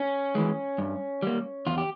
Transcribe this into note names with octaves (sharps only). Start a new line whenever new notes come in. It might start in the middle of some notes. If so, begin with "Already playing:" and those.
Already playing: C#4
E3 G#3
G2
G3 A#3
E2 F4
G4